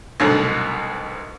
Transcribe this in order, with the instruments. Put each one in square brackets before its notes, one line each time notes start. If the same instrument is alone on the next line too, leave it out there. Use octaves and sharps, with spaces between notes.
[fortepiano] C2 G#2 B2 D3 F#3 A3